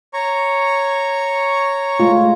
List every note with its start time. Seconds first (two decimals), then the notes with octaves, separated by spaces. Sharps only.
0.14 C#5 A#5 C#6
2.00 G#3 A3 F4